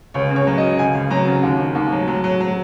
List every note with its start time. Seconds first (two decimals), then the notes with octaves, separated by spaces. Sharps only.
0.14 C#2 C#5
0.30 C#3
0.36 C#5
0.47 F#3
0.58 C#3 D#5
0.79 C#2 G#5
0.94 C#2
1.10 F#3 A#5
1.27 C#3
1.43 D#2
1.59 D#3
1.75 D#2
1.92 F#3
2.08 F#3
2.24 F#3
2.41 F#3